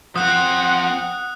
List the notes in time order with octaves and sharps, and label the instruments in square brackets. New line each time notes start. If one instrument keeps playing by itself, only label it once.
[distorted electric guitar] F3 C4 [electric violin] F#5 [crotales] D#6 F#6